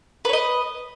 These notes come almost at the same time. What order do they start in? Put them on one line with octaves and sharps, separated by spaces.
B4 C#5 D#5